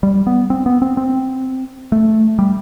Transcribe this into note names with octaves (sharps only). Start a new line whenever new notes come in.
G3
B3
C4
B3
C4
C4
A3
G3